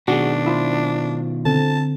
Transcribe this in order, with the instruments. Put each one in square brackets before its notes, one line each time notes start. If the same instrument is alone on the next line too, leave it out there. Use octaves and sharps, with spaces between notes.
[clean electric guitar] B2 D#3 [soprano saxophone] D4 [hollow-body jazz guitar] F#4 G#4
[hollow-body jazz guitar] E4 F4 C5
[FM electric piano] D3 C4 A4 [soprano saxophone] A5